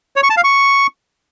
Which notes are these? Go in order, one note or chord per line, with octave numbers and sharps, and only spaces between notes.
C#5
C#6
A5
F5
C#6